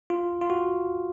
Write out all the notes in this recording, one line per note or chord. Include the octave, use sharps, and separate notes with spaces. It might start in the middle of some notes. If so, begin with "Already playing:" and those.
F4
F4
F#4